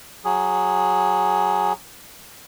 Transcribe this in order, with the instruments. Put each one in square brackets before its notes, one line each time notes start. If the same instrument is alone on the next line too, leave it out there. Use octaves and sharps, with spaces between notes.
[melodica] F#3 G#4